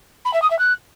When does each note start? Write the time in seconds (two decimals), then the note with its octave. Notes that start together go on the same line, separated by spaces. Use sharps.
0.25 B5
0.33 E5
0.42 D#6
0.50 E5
0.59 F#6